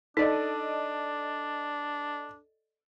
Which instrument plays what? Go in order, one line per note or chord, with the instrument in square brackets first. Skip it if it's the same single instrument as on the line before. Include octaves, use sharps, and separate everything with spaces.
[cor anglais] D4 [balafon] D#4 [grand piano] A4 D5 D#5